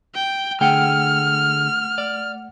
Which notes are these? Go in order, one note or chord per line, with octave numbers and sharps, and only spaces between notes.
G5
D3 A3 G#4 F#5 G5 F6 C#7
D5